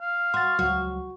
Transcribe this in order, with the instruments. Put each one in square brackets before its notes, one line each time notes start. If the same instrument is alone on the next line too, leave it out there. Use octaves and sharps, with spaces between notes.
[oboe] F5
[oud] F#4 [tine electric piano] C6 A6
[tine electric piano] C#2 F#3 [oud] F#4